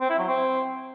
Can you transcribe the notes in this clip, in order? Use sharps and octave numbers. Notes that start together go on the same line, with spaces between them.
C4
E4
F#3
C4